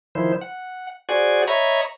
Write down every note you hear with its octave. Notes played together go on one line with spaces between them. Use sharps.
D#3 F3 E4 C5
F#5
F#4 G#4 C5 D5 F#5 G#5
C#5 D#5 E5 A#5 B5 C#6